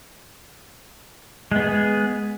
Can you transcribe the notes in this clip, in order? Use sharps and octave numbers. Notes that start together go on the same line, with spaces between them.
G#3 B3 G#4